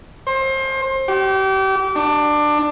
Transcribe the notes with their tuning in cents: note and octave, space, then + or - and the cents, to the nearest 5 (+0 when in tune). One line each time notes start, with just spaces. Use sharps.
C5 +30
G4 -35
D4 +20